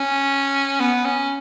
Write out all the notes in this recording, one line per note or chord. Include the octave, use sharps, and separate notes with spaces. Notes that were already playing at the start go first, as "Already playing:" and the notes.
Already playing: C#4
B3
C#4